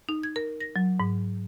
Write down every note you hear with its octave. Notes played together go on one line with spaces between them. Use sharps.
D#4
G#6
A#4
A#6
F#3
G#2